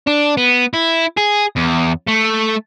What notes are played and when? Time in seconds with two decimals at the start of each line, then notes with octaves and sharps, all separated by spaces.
0.07 D4
0.37 B3
0.74 E4
1.18 G#4
1.57 E2
2.07 A3